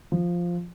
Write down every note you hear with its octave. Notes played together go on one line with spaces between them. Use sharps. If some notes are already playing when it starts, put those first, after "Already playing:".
F3